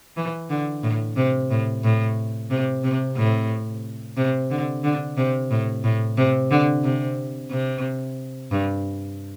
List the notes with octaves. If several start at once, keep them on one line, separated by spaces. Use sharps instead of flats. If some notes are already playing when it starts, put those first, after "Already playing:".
E3
D3
A2
C3
A2
A2
C3
C3
A2
C3
D3
D3
C3
A2
A2
C3
D3
C3
C3
G2